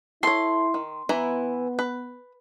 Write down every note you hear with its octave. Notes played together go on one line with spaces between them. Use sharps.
E4 A4 C#5 C6
D#3
E3 B3 E4 A#5
B4